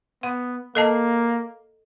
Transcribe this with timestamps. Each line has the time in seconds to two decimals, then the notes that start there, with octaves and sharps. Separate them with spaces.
0.23 B3 F#5
0.75 A#3 A4 D#5 A5